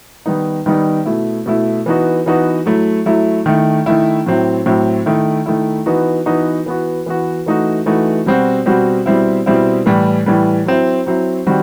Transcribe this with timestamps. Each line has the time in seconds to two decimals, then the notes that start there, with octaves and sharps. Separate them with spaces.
0.26 D#3 G3 B3 D#4
0.66 D#3 G3 B3 D#4
1.06 B2 A3 E4
1.46 B2 A3 E4
1.86 E3 B3 D#4 F#4
2.26 E3 B3 D#4 F#4
2.66 F#3 A3 E4
3.06 F#3 A3 E4
3.46 D#3 A3 E4
3.86 D#3 A3 E4
4.26 A2 F#3 C4 E4
4.66 A2 F#3 C4 E4
5.06 D#3 A3 E4
5.46 D#3 A3 E4
5.86 E3 B3 D#4 F#4
6.26 E3 B3 D#4 F#4
6.66 E3 B3 F#4
7.06 E3 B3 F#4
7.46 E3 A3 D#4 F#4
7.86 E3 A3 D#4 F#4
8.26 B2 G3 C4 F#4
8.66 B2 G3 C4 F#4
9.06 B2 G3 C4 E4
9.46 B2 G3 C4 E4
9.86 A2 E3 G3
10.26 A2 E3 G3
10.66 F#3 C4 E4
11.06 F#3 C4 E4
11.47 D#3 G3 C4 F#4